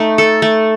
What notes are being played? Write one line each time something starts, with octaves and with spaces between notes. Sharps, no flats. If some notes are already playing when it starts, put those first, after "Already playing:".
Already playing: A3 D#4
A4
A3